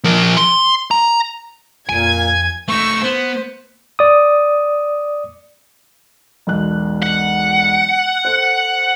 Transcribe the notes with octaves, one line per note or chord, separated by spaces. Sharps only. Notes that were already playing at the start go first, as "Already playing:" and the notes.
F3 A#4
C6
A#5
F2 A#2 G#5 G#6
A3 D#4 C#6 E6
B3 C5
D5 D#6
E1 B1 F#6
F#5
A4 C5